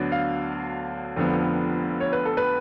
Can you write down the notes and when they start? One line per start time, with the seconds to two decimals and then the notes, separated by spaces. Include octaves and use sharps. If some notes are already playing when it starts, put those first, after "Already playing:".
Already playing: D2 D3 F#3 B3 D4
0.12 F5
1.16 F1 F2 D3 F3 B3
2.00 C#5
2.13 B4
2.25 A4
2.37 B4